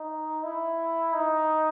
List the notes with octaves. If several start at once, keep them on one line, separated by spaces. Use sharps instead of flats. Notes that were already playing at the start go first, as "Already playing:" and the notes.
Already playing: D#4
E4
D#4